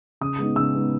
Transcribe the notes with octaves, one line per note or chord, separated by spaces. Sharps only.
C#3 D#6
G#3 B3 D#4
C#3 E6
G#3 B3 D#4